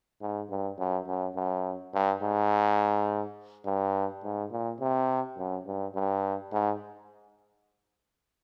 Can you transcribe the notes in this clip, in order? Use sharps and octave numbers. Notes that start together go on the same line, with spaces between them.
G#2
G2
F#2
F#2
F#2
G2
G#2
G2
G#2
A#2
C3
F#2
G2
G2
G#2